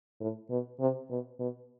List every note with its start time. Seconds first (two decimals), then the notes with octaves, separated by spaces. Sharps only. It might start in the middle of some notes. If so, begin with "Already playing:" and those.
0.20 A2
0.50 B2
0.80 C3
1.10 B2
1.39 B2